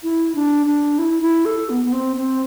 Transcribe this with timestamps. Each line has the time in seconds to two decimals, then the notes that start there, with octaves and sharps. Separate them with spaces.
0.03 E4
0.35 D4
0.66 D4
0.98 E4
1.22 E4
1.45 A4
1.69 B3
1.85 B3
1.92 C4
2.16 C4